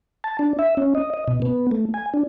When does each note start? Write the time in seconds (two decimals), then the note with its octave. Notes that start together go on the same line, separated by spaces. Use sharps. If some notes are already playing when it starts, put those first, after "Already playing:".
0.24 A5
0.39 D4
0.59 E5
0.77 C#4
0.95 D#5
1.14 D#5
1.28 B2
1.42 B3
1.71 A3
1.94 G#5
2.14 D4